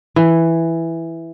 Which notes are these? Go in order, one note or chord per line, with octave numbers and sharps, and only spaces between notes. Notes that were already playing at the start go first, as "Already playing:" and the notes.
E3